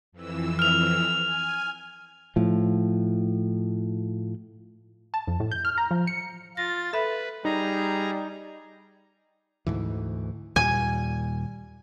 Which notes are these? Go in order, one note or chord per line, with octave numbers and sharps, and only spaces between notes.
F2 E3 E6
F6 F7
G#5
A2 F3
A5
F2
A2
G6
F6
A#5
F3
C#7
F4 A6 A#6
A4 B4 E5 B5
G3 D#4 G#4 A#5
D2 G#2 E3
D#2 A#2 G3 G#5